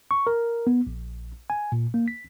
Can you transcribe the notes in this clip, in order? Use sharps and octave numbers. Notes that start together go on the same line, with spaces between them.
C#6
A#4
B3
A#1
G#5
A#2
A#3
B6